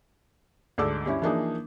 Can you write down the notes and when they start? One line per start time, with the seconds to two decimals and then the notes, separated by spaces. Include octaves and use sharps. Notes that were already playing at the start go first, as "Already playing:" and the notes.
0.78 D2 G#2 A4 D5 D6 E6
1.06 G2 C#4 E4
1.22 E3 F3 A#3 D4 D#4 G#4